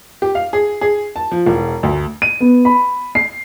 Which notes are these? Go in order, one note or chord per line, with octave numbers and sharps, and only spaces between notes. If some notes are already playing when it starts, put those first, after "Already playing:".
G4
F5
G#4
G#4
A5
F3
E1
D2
D#7
B3
B5
C7